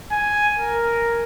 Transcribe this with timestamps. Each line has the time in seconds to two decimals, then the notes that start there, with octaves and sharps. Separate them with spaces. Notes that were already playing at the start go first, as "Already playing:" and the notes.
0.11 G#5
0.59 A#4